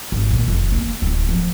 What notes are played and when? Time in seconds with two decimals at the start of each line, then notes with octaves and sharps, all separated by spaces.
0.12 G#1
0.31 A#2
0.48 F1
0.72 A#3
1.02 D1
1.29 F3